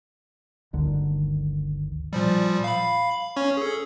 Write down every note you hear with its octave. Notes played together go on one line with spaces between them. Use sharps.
G1 D2 D3 D#3
A#2 F3 G3
F5 B5
C#4 C#5 C#6
G#4 A4